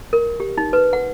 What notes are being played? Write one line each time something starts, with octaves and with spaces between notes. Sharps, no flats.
A#4
G4
D#4
B4
F#5